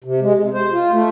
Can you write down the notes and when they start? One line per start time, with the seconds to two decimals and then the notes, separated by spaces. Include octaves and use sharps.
0.04 C3
0.22 G#3
0.39 C3
0.54 C5
0.72 F4
0.92 A3